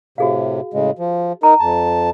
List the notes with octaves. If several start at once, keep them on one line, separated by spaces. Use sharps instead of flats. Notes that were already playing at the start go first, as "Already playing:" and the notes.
A2 C3 F#4 G#4 F5
A2 C#3 G#3
F3
D#4 A#4 A#5
F2 A5